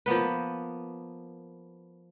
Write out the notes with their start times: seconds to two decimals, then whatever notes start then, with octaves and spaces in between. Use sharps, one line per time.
0.06 F3 A#3 B3 B4